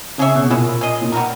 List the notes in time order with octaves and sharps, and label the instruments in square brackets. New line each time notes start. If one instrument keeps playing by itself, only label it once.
[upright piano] C#3 [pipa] C#4 G#4 C#5 E5
[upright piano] B2
[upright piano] A#2 [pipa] G#3 C#4 E4
[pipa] C#4 G#4 D#5
[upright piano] A#2
[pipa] G3 B3 D#4 A#4